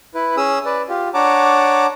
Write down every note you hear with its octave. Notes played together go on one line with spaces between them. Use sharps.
E4 B4
C#4 G#4 D#6 E6
B4 D5
F4 G4
D4 C#5 F#5 A5 A#5 D6